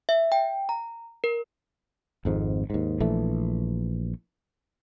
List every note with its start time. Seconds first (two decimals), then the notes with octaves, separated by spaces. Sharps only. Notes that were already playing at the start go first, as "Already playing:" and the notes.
0.09 E5
0.32 G5
0.69 A#5
1.24 A#4
2.25 G#1 F2 G#2
2.70 D#2 G#2
3.00 A#1 E3 A3